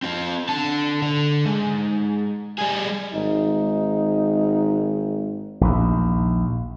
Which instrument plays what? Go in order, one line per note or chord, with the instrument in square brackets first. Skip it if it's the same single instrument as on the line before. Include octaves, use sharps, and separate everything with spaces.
[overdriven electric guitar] C4 F4
D3 A5
D3
G#2
G3 G#4
[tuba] G#1 [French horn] D#4
[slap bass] A#1 D#2